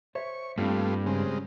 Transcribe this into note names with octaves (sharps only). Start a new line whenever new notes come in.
C5 C#5 E5 C#6
G2 G3 A3 A#3 C4 F4
C#3 G3 G#3 C4 C#4